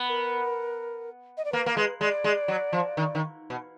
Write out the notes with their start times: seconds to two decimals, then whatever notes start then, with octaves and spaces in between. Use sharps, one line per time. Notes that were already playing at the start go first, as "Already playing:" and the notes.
Already playing: B3
0.09 A#4
1.37 D#5
1.44 D5
1.52 A#3 B4
1.66 A#3
1.77 G#3 B4
2.00 G#3 D5
2.24 G#3
2.48 F#3
2.72 F3
2.97 D#3
3.15 D#3
3.50 B2